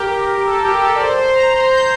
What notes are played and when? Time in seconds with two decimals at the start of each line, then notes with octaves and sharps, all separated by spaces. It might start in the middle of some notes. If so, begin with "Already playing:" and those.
Already playing: G4 A#4
0.30 G4
0.46 A4
0.65 G4
0.82 A4
0.96 D5
1.00 C5
1.18 C5
1.35 A#5
1.53 C6
1.71 G6